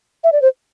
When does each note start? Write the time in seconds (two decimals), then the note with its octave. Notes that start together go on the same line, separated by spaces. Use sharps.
0.24 E5
0.32 D5
0.42 C5